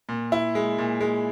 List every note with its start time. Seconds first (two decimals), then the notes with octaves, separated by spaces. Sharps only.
0.09 A#2
0.32 E4
0.55 G#3
0.78 A#2
1.01 G#3